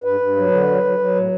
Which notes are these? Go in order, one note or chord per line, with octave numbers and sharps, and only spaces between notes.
G2 B4
G2
F#3
D3
F#3
F#3
F#3
A2